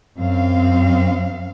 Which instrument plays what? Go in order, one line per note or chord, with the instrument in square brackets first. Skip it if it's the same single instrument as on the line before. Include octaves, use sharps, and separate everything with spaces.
[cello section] F#2 C4 F5